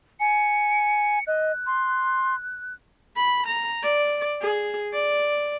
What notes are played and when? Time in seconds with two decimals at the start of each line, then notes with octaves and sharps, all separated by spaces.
0.20 G#5 C#7
1.27 D#5 F#6
1.67 C6
3.17 B5
3.47 A#5
3.83 D5
4.42 G#4
4.94 D5